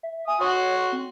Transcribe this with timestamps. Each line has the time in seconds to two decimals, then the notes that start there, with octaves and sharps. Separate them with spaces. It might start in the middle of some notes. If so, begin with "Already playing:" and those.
0.03 E5
0.28 G#5 D#6
0.41 F#4 C#5 C6 C#6
0.92 C4